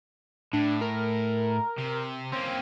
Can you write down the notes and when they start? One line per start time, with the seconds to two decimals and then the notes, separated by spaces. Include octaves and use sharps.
0.53 A2 D4
0.81 A#4
1.78 C3
2.32 A#3 C4 C#4